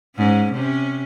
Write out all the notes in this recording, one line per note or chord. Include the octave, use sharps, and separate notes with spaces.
G#2 C#4
C3 C#4